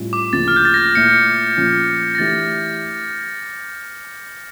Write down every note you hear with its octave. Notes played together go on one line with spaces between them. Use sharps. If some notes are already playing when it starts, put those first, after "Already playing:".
Already playing: A2 G3 C#4 F4
D6
D2 C#3 F3 A#3 A6
F6
G6
A6
A#6
A#2 A3 E4 C#7
A#2 F3 C#4
A#6
E3 A3 D4 G4 A6